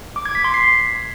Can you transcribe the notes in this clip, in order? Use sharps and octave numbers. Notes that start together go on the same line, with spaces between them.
D6
G#6
B6
C6
C7